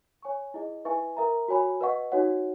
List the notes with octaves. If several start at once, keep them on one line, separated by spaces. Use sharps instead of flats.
C#5 G#5 C#6
E4 G#4 D#5
E4 B4 E5 G#5 C#6
A#4 E5 A#5
F#4 C#5 G#5 B5
B4 D#5 F#5 C#6
D#4 F#4 C#5 F#5